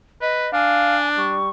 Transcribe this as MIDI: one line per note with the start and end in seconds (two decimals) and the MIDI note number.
0.22 0.48 71
0.22 0.51 75
0.53 1.38 62
0.53 0.97 77
0.53 1.09 80
1.17 1.50 55
1.17 1.49 85